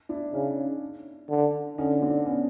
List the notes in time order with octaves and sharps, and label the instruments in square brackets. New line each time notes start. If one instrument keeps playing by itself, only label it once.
[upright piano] D4 E4
[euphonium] C#3 [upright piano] C#4 D#4
[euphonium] D3
[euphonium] D3 [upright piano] C#4 D#4
[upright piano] C4 D4
B3 C#4